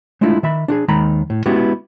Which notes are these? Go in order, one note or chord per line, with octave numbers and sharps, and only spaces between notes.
G#3 A3 D4 E4 F4
D#3 E5 B5
D4 F#4 G#4
D#2 D#3 G#3 A#5 B5
A2
G#3 B3 C#4 E4 F#4 G4